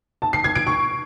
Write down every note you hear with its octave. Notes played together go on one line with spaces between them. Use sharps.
A5
C7
G#6
D7
C#6